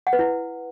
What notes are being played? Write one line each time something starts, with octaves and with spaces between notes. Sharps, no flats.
F#5
B4
E4